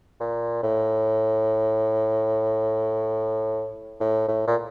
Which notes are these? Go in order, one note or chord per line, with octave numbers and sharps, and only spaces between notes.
A#2
A2
A2
A2
A#2